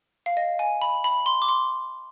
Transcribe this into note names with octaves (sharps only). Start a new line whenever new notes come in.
F5
D#5
G#5
B5
B5
C6
D6
C6